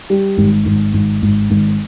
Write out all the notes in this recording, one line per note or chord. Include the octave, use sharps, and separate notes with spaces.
G3
G#1
G#1
G#1
G#1
G#1